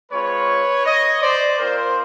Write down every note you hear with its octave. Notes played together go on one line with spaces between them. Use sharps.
G#3 C4 F4 B4 C#5
C#5 D#5
C5 D5
C4 F4 A#4 C5